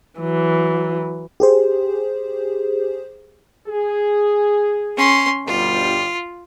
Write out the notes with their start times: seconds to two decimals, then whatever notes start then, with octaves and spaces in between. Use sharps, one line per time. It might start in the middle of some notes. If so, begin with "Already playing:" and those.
0.19 E3 F#3
1.40 G4 G#4 C5
3.68 G#4
4.97 C#4 C6
5.47 G1 B2 G3 F4